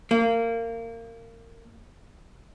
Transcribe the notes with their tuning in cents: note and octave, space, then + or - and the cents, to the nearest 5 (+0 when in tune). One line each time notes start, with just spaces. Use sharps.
A#3 -25